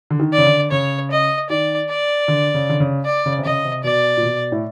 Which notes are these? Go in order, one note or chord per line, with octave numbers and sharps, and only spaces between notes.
D3
D#3
D5
C#3
D3
C#3 C#5
D#5
D#3 D5
D5
D3
C#3
D3
C#3
D5
C#3
C3
C#3 D#5
C3
B2 D5
A#2
B2
A2